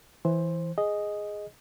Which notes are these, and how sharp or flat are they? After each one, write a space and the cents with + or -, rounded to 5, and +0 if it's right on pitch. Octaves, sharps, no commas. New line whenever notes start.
E3 +0 C5 +10
G#4 +0 D#5 +0